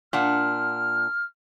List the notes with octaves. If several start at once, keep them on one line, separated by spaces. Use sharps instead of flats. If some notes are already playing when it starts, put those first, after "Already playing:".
A#2 D4 F#5 F6